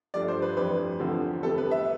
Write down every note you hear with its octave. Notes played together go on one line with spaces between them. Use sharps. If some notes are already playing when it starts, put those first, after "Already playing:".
G2 F3 A3 D4 D5
C5
B4
F2 E3 G3 D4 B4
E2 D3 F3 A3 C4
C3 G3 B3 A4
B4
E5